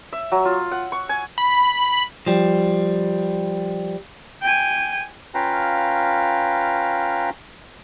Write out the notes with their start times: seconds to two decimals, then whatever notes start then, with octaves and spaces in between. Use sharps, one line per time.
0.13 E5
0.32 F#3
0.45 F4
0.71 F#5
0.92 C#6
1.09 G#5
1.38 B5
2.26 F3 G3
4.42 G5 G#5
5.35 C#4 F4 B4 F5 G5 A#5